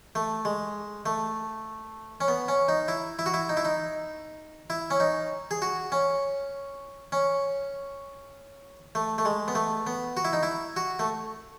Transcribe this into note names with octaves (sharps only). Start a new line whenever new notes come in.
A3
G#3
A3
C#4
B3
C#4
D#4
E4
E4
F#4
E4
D#4
E4
D#4
E4
C#4
D#4
G#4
F#4
C#4
C#4
A3
A3
G#3
B3
A3
B3
F#4
E4
D#4
E4
F#4
A3